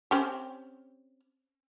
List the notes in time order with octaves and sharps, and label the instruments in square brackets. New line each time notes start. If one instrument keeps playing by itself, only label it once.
[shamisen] C4 C#4 G4